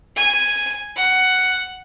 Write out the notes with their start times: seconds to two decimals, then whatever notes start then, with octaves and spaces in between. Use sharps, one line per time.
0.16 G#5
0.96 F#5